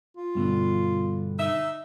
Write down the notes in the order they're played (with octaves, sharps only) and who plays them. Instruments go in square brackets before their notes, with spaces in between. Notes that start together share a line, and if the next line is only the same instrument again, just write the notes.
[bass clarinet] F4
[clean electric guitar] G2 B2 D3
[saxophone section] D#4 E5